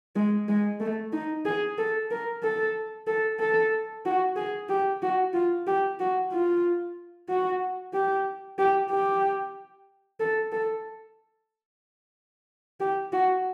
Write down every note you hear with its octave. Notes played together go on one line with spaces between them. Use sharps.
G#3
G#3
A3
D#4
G#4
A4
A#4
A4
A4
A4
F#4
G#4
G4
F#4
F4
G4
F#4
F4
F#4
G4
G4
G4
A4
A4
G4
F#4